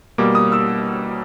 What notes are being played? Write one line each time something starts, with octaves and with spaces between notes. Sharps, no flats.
B2 G3 A#3 D6
D#6
E6